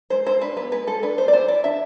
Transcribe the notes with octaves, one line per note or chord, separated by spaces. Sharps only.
G#3 C5
G#3 C5
D4 B4
B3 B4
G#3 B4
G#3 A4
D4 B4
B3 C5
D5
E3 C5
E3 D5
D4 E5